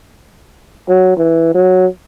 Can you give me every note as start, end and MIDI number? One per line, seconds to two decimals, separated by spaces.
0.88 1.16 54
1.17 1.52 52
1.54 1.86 54